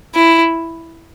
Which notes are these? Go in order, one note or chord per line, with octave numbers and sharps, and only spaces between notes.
E4